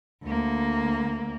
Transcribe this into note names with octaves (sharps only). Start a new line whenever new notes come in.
D2 A#3